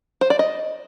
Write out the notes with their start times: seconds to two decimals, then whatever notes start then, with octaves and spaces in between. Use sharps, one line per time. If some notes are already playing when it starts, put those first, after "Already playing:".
0.21 C5
0.30 D5
0.39 D#5